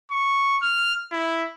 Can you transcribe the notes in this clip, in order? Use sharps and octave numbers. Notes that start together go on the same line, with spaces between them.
C#6
F6
E4